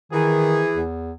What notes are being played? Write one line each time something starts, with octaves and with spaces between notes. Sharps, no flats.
D#3 E3 G#4
E2